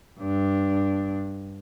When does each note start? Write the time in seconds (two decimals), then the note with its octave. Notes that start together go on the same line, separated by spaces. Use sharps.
0.20 G2 D4